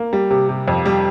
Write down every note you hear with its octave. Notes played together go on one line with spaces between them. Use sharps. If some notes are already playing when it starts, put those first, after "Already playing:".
Already playing: A#3
G3
C3
C3
F2
G3